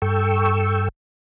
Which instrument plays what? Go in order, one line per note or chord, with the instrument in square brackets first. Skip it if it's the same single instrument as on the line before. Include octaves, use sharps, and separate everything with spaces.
[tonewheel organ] G2 A4 G5 C#6 E6